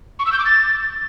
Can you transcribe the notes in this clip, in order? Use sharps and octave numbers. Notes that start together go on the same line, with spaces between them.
C#6
E6
G6
D6
A6